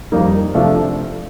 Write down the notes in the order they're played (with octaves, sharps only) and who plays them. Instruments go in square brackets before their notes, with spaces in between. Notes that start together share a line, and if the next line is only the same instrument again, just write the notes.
[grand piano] F2 D#3 G3 A#3 D#4
C3 F3 A3 D4